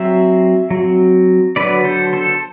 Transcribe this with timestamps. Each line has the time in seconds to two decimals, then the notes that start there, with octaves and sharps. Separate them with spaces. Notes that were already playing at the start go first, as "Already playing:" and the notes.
Already playing: F#3 C4 C5 E5
0.71 F#3 C4
1.56 D3 F#3 B3 B4 D5
1.84 A4 C5
2.13 A4 C5